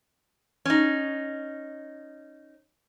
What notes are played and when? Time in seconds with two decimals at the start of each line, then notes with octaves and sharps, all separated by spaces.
0.65 C#4 D#4